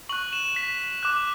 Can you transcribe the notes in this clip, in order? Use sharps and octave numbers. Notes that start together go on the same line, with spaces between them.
C#6 F#6 F#7
E7
B6
D6 F#6